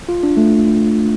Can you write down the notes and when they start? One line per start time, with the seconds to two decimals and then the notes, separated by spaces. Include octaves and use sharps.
0.09 F4
0.23 D4
0.37 A3